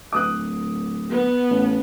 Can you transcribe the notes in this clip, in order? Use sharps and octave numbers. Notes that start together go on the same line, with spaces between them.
D1 D6 D#6 F#6
B3
A1